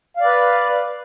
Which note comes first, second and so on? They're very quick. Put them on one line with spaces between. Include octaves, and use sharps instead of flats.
F5 D5 B4